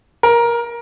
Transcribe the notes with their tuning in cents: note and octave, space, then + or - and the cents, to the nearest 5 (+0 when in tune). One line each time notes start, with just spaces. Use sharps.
A#4 +15